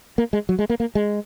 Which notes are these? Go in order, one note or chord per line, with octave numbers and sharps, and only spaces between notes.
A#3
G#3
F#3
G#3
A#3
A#3
G#3